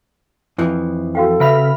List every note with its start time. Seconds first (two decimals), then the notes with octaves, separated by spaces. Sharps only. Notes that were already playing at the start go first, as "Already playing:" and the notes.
0.58 F2 E3 F3
1.15 F#4 A4 F5 G5
1.40 C#3 B4 E5 F#5 B5 F6